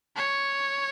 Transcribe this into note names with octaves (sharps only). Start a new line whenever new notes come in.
C#5